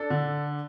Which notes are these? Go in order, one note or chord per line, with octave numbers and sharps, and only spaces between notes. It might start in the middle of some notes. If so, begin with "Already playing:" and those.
Already playing: D4 A4
D3